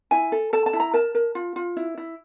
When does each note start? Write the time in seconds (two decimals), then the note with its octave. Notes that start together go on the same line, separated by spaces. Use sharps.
0.11 E4 G#5
0.32 A4
0.53 A4 A5
0.66 A5
0.73 E4
0.80 A#5
0.93 A#4 A5
1.15 A#4
1.35 F4
1.56 F4
1.77 E4
1.98 E4